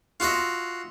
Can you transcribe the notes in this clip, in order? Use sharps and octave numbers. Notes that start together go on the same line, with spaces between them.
F4 F#4 D#5 E5